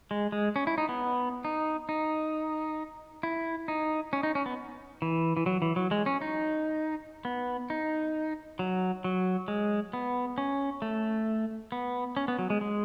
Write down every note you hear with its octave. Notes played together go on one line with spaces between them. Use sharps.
G#3
G#3
C#4
E4
D#4
B3
D#4
D#4
E4
D#4
C#4
D#4
C#4
B3
E3
E3
F#3
E3
F#3
G#3
C#4
D#4
B3
D#4
F#3
F#3
G#3
B3
C#4
A3
B3
C#4
B3
F#3
G#3
G#3